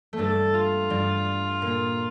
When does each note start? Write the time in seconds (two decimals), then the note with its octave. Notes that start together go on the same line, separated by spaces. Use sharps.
0.13 A3
0.18 G2 G3 A4
0.54 F4
0.90 G2 G3
1.62 A#2